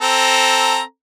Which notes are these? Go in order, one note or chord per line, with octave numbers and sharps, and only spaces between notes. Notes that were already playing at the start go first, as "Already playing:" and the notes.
C4 A4 A#5